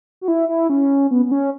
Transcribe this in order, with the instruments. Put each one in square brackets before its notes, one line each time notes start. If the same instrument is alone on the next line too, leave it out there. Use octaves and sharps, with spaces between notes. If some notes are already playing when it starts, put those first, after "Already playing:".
[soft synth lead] F#4
E4
E4
C#4
B3
B3
C#4